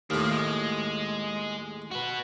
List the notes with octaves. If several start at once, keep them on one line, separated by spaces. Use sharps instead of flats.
D#2 A2 A#3 F4
G#3
F#4 B4